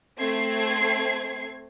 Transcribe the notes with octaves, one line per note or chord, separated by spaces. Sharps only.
A3 C4 G#6 C7